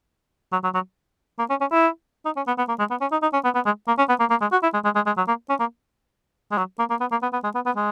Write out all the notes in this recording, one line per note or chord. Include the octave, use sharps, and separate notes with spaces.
F#3
F#3
F#3
A#3
C#4
C#4
E4
D#4
C#4
B3
B3
A#3
G#3
B3
C#4
D#4
D#4
C#4
B3
B3
G#3
A#3
C#4
B3
A#3
A#3
G#3
F#4
E4
G#3
G#3
G#3
G#3
F#3
A#3
C#4
A#3
G#3
F#3
A#3
A#3
B3
A#3
B3
B3
G#3
B3
B3
G#3